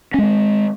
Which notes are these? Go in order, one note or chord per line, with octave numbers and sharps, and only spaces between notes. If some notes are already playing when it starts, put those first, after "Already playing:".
G#3 C4 C#4